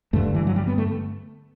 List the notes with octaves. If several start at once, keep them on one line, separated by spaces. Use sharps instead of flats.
G2 D3 A3
E3
F#3
G3
B3
A3